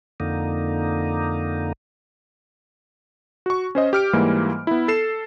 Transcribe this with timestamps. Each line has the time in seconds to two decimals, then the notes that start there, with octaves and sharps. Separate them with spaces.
0.20 F2 D3 A#3 D#4
3.46 F#4 C#6
3.75 C#4 C5 D#5
3.93 G4 F6 D7
4.13 G#2 E3 G3 A#3
4.67 B3 E4
4.88 A4 C7 E7